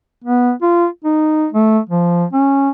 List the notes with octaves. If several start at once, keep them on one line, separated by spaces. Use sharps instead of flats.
B3
F4
D#4
A3
F3
C#4